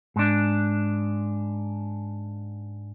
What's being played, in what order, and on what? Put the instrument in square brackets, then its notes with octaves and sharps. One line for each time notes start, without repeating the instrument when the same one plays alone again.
[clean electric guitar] G#2 D4